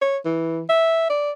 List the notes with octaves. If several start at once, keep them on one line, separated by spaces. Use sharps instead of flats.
C#5
E3
E5
D5